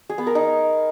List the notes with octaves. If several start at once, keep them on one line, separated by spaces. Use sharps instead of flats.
G#4
B3
A#4
D#4